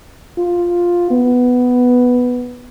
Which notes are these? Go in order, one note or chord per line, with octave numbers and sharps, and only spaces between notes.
F4
B3